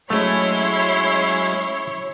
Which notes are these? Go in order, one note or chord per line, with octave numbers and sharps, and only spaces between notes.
F#3 G#3 A3 C#4 E4 C#5 C6